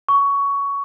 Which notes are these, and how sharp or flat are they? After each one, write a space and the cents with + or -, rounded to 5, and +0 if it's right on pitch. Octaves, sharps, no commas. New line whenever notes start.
C#6 +15